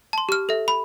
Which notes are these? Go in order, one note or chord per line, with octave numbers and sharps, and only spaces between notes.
A5 C6
G4 F6
A4 E5
B5